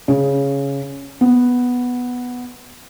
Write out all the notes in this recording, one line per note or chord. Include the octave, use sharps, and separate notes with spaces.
C#3
B3